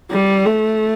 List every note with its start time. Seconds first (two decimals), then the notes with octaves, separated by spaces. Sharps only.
0.11 G3
0.46 A3